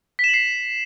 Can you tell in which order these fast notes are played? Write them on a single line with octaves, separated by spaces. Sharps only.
B6 E7 F#7 C7